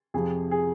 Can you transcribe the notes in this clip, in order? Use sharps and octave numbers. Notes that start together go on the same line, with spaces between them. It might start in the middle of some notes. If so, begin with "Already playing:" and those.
F2 C3 F3 G#4
G#4